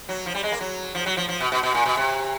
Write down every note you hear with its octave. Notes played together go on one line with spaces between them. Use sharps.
F#3
F3
G3
G#3
A#3
F#3
F3
F#3
F3
F3
B2
B2
B2
A#2
B2
C3